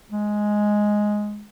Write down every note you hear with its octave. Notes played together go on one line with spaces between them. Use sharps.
G#3